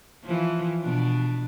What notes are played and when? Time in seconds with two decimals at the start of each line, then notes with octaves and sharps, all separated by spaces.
0.24 E3 F3
0.81 B2 D4